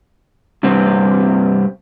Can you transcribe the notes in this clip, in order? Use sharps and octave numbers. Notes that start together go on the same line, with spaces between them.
G2 C3 B3 C4